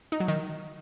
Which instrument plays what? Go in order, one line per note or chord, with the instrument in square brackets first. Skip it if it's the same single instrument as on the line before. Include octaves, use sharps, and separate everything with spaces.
[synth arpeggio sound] D#4
F#3
D#3